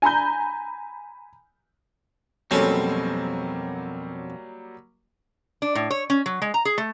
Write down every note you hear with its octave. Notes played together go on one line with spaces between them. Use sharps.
G#5 A#5 B5 G6
F2 B2 F#3 G3 A#3 C4 C#4 A4
D4
A2
C#5
C#4
F#3
G#3
A#5
G#4
A3